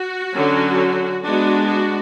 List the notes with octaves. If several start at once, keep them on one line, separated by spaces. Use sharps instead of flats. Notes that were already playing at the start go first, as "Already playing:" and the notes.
Already playing: F#4
D3 F#3 C#4
G#3 B3 D4 F#4
F#4